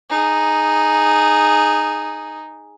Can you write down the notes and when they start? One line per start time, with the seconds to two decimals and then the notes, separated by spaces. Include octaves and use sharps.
0.10 D#4 G#4